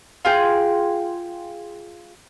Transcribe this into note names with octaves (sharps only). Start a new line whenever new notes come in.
F4 G#4 G5